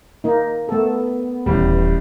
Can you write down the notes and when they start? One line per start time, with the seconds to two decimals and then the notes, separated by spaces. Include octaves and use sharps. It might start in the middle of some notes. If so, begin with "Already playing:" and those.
0.24 A#3 D#4
0.69 A3 B3 A4
1.46 D#1 A1 G3